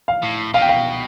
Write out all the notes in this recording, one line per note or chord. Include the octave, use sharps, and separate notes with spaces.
F5
A2
B2 F5
G5
F5